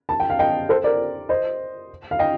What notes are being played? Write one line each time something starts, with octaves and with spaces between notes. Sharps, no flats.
A5
G5
F5
D#5 G5
A4 C5
A#4 D5
C5 D#5
F5
D#5 G5